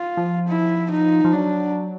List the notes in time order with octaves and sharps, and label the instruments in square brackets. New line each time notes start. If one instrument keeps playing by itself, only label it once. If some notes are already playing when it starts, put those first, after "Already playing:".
Already playing: [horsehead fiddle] F4
[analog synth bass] F3
[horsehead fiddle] E4
D#4
[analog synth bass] F3
[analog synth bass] F#3 [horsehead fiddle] D4